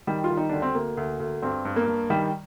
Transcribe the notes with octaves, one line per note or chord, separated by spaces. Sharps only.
D#3 G3
F4
D#3
D#4
D2 D4
C4
D2 A#3
D2
D2
G2 C4
G2
A#3
G2
D#3 G3